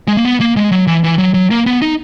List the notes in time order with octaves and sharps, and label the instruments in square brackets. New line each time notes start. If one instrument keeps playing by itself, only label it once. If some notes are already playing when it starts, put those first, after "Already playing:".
[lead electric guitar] G#3
A#3
B3
A#3
G#3
F#3
E3
E3
F#3
F#3
A#3
B3
D#4